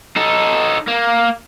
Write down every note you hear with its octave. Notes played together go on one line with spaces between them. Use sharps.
D#4 A4
A#3